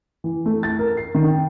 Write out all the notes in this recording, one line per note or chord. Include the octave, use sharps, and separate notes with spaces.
E3
A3
A6
A#4
C7
D#3
G5